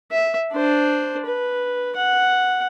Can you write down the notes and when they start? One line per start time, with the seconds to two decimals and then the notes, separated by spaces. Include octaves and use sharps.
0.12 E5
0.53 D4 C5
1.26 B4
1.96 F#5